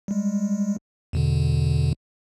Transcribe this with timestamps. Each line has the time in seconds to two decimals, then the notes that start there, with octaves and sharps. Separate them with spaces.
0.08 G3 G#3
1.13 E2 B2 D3